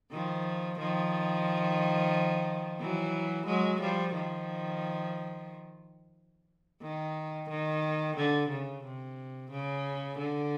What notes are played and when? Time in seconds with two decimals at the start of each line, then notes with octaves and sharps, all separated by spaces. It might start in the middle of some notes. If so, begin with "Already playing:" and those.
0.11 D#3 F3
0.78 D#3 F3
2.80 E3 F#3
3.46 F#3 G#3
3.80 F3 G3
4.14 D#3 F3
6.82 D#3
7.49 D#3
8.16 D3
8.49 C#3
8.84 C3
9.51 C#3
10.18 D3